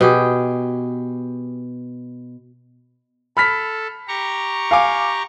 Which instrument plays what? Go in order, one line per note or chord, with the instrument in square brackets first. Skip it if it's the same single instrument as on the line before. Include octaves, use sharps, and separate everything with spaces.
[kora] B2 G4 G#4
[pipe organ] A4 [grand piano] B5 F6 B6
[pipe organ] G4 A#5 C#6
[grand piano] F5 G#5 D6